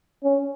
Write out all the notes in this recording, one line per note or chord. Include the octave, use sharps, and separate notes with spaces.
C#4